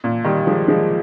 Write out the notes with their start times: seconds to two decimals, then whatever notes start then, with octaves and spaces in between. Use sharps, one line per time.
0.04 A#2
0.24 D#3 G3
0.47 F3 G#3
0.68 F3 G#3